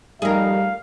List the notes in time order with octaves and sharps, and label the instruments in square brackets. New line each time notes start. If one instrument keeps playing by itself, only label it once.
[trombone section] F3 A3 D#4 [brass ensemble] G3 [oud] G#4 A#4 [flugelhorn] F5